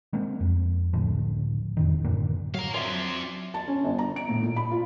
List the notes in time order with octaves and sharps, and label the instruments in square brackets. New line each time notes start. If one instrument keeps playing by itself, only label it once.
[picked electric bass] G#3 A#3 C4
F2
C#2 A2 D3 F3
E1 F2 D#3
F#2 A2 D3 A#3
[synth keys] F#3 [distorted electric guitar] F5 A#5
[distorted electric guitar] C4 F4 [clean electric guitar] C#5 D5 E5 [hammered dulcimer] C6
[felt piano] A5
C#4
G1
A#5
D7
A2
A#2
B5
F4